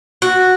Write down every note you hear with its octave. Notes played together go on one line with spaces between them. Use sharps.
F#4